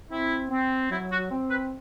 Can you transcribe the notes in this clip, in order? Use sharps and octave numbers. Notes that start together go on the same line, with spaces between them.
C4 E4
C4
F#3 E4
F#4
C4
B4